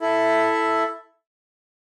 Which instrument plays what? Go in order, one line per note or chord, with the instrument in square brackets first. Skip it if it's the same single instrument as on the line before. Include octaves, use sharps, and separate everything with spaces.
[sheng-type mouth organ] E4 A4 E5